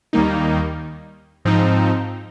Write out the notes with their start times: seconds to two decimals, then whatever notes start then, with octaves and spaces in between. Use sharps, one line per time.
0.13 D#2 D#3 G3 A#3 D#4
1.45 G#2 F3 C4 D#4